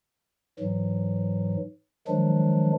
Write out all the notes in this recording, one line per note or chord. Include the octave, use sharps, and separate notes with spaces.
G#2 E3 F#3
D#3 F3 F#3 G#3 D4